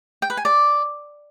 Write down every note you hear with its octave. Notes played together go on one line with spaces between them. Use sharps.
G5
B4
G#5
D5